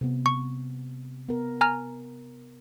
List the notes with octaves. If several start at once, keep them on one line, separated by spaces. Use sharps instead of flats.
C3 B3
C#6
B3 A#4
G#5 A#5 F6